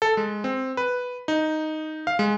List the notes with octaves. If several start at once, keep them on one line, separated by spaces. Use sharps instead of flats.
A4
G#3
C4
B4
D#4
F5
G#3